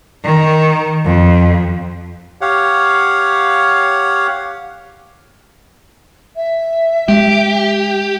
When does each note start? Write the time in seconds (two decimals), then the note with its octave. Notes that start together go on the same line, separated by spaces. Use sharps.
0.23 D#3
1.04 F2
2.41 G4 C#5 F5 F#5
6.35 E5
7.08 G#3 G4